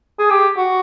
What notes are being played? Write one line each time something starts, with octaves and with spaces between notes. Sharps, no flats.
G#4
G4
F#4